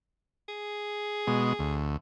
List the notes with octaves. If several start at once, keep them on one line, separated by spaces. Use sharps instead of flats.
G#4
B2 G#3
D2